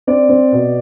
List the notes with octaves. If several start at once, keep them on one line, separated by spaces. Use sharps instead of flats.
C4 D5
C4
B2